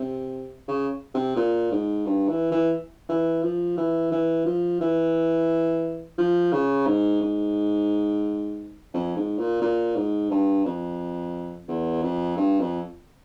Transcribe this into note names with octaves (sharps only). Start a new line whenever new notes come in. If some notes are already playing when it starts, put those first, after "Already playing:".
Already playing: C3
C#3
C3
A#2
G#2
G2
E3
E3
E3
F3
E3
E3
F3
E3
F3
C#3
G#2
G#2
F2
G#2
A#2
A#2
G#2
G2
F2
E2
F2
G2
F2